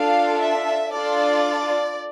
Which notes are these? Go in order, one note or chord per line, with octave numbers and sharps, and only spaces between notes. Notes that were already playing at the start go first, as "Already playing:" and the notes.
Already playing: D4 F4 A4 F5
E5
D4 F4 A4 D5